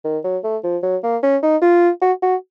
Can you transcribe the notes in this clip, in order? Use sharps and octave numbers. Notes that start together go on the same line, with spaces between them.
D#3
F#3
A3
F3
F#3
A#3
C#4
D#4
F4
F#4
F#4